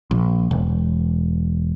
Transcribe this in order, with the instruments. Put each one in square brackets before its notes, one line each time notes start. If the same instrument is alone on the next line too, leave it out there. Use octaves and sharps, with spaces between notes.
[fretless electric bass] A#1
E1